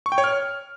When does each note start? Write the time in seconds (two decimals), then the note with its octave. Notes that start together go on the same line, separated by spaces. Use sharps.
0.06 C#6
0.12 G5
0.18 C#5
0.24 F6